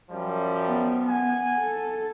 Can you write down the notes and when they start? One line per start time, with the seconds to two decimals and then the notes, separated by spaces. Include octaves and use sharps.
0.11 F#2 F3 G3
0.65 B3
1.07 F#5 G#5
1.59 A4